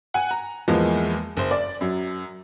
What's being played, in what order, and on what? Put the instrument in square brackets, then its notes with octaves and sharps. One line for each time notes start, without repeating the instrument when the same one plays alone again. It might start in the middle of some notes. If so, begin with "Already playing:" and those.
[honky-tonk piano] F#5 G#5
A#5
E2 E3 F3 G#3 A#3
F#1 C5
D5
F#2 F#3